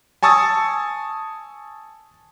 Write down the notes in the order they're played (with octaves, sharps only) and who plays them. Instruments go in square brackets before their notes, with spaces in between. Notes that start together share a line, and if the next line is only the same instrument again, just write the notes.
[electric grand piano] G#5 A5 C#6 D#6 E6 A6